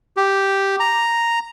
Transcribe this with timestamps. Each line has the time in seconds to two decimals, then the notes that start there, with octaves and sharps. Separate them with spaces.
0.17 G4
0.80 A#5